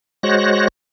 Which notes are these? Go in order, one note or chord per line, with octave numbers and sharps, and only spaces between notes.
G#3 F#4 C5 C#5 F#6 A#6